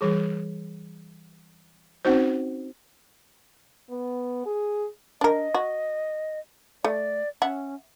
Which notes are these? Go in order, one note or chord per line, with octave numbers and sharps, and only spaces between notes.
E3 G3 G#4
C4 C#4 D#4 F#4 C5
B3
G#4
D4 A#4 D#5
F#4
A3 D5
C#4 E5 F#5